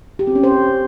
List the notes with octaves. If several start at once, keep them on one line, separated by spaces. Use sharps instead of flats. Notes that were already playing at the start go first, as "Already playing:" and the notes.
G4
C4
C#4
C5